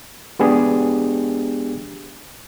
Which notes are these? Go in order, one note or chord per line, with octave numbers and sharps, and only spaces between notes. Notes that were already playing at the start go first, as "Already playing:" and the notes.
G#3 B3 D4 G4 G#4